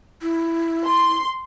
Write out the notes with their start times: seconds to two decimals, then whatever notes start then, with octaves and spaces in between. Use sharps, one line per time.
0.22 E4
0.86 C6